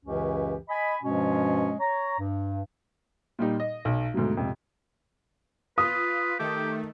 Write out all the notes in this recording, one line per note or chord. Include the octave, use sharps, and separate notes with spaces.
C#2 F#2 C#3 E3 C#4 G4
D#5 G#5 B5
G2 B2 F3 G#3 C#4
C#5 A#5
G2
A#2 G3 D#4
D#5
B1
D2 G#2 B2 F#3
F2 G#2 C3
F4 B4 D#6
D#3 A3 G4